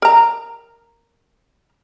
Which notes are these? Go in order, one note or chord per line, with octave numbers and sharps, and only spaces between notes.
A#4 A#5